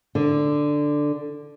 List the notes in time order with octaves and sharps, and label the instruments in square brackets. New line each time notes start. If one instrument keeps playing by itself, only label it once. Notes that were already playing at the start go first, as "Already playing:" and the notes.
[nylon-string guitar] D3